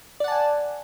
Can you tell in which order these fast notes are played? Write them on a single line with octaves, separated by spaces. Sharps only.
D5 F#5 A5 G#5